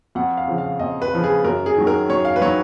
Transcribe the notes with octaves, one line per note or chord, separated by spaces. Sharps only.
F2 F#5
F5
C#3 F3
F5
F2 D#5
B4
C#3 F3
G#4
F#2 A#4
G#4
D#3 F#3
A#4
F#2 C#5
F5
B4
D#3 F#3 C#5